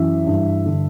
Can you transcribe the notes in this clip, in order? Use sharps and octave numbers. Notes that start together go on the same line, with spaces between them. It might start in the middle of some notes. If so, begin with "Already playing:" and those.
Already playing: F#2 E3 E5
G2
D3